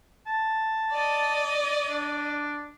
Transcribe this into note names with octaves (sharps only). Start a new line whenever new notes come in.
A5
D5 D#5
D4